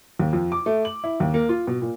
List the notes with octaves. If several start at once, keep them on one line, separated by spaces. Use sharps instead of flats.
D#2
F2
D6
A3
F#7
E4
D#2
A#3
F4
B2
A#2